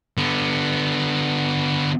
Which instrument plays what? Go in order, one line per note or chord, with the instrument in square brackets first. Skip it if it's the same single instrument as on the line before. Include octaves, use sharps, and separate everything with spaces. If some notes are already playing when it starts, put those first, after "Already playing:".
[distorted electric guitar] D3 B3